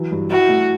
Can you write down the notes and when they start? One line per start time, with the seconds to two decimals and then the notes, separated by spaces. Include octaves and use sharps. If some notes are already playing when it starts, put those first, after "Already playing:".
Already playing: E3 F#3
0.11 G2
0.30 E4 F#4
0.49 A3